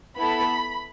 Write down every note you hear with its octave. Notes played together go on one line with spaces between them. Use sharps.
B3 E4 A4 B5